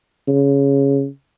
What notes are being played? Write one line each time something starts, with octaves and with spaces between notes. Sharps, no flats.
C#3